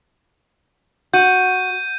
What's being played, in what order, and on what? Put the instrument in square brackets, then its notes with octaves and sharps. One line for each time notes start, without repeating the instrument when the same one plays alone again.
[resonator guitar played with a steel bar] F#4 [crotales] G6 D#7